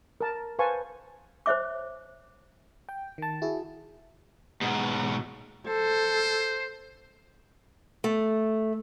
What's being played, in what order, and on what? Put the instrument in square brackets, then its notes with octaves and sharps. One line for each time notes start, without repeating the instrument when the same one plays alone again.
[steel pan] A#4 A5
B4 C5 F5 G#5 A5 C#6
[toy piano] C5 C#5 E5 D6
[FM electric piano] G5
D#3 A5
E4 F#4 G#4
[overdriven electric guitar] G#2 B2
[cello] A4 [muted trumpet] C5
[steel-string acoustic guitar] A3